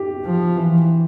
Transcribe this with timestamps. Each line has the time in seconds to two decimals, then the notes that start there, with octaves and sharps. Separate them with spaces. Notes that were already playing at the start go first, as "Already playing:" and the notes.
Already playing: G4
0.25 F3
0.57 E3